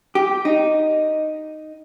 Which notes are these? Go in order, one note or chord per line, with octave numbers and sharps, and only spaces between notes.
G4
D#4